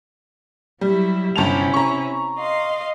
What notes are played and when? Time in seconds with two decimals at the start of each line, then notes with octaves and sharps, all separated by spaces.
0.81 F#3 G3 E4
1.36 G1 C3 C#4 E4 A5 F7
1.74 A#5 C#6
2.38 D#5 F5 C6